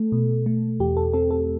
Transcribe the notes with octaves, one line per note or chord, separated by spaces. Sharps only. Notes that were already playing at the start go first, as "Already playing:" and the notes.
Already playing: A3 A4
B2
A3
E2 G4
A4
C4 A4
A4